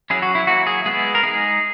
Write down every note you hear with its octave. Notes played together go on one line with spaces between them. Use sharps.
F#3 C#4 E4 G#4
F#4
E4
F#3 A#3 E4 F#4
G#4
G#3 B3 E4 G#4
A#4
G#3 D#4 G#4